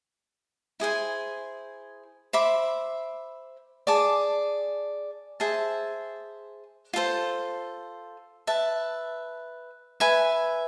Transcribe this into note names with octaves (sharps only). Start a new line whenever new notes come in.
E4 G#4 C5 G#5
C5 E5 B5 D6
G#4 D5 A5 D6
G#4 C5 E5 A5
F4 A4 C5
B4 E5 A5
B4 E5 G#5 B5